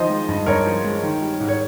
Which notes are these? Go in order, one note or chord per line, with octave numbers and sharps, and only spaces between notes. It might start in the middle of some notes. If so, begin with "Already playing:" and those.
Already playing: D#3 F3 C5 D#5
G#3
G2
G2 A#4 C#5
F3
G#3
D#3
G3
G#2
C#5